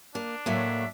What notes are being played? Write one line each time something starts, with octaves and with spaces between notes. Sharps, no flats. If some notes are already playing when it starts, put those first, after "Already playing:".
A#3 D4
A2 F#3 A3 A#3 E5